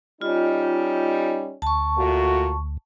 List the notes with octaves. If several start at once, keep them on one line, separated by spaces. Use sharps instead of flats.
G3 C#4 D#4 F4
D2 A5 C#6
A#2 A3 F#4